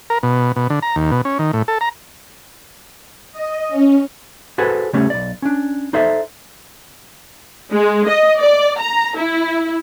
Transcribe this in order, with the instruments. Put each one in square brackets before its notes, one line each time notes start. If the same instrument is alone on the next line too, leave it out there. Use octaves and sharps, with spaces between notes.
[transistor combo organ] A#4
B2
B2
D3
A#5
D#2
B2
C#4
D#3
A2
A4
A#5
[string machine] D#5
C#4
[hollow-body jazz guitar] F#4 G#4 A4 B4 C5 G#5
C#3 G3 A3 C#4 G#4
B1 D5
C#4 D4
D#4 A4 C5 D5 E5
[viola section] G#3
D#5
D5
A#5
E4